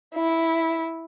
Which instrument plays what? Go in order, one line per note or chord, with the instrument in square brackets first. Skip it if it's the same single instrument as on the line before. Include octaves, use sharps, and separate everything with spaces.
[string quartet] E4